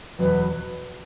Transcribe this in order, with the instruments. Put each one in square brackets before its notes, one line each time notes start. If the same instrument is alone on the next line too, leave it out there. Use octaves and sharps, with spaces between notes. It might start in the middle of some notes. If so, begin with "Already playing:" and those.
[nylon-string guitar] E2 B2 F#3 [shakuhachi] B4